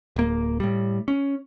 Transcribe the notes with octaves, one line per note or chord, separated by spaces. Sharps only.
D1 A#3
A2 G3
C#4